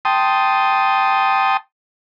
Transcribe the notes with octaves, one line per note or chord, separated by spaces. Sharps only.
G5 A5 C6 D#6